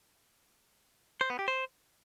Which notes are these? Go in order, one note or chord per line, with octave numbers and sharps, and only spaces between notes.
C5
B3
G4
C5